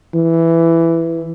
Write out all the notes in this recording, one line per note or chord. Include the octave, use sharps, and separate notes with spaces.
E3